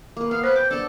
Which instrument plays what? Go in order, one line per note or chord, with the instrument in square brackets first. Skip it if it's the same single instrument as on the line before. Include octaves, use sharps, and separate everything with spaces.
[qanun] A#3 B4
[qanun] B3 [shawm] F5
[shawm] B4 [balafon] C5
[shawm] G5 [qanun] D6
[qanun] B3 D4 [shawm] A4